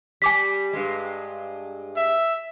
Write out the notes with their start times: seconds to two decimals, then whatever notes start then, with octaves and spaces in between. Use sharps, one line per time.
0.22 G3 G#5 D6 B6
0.73 G2 G#3
1.96 E5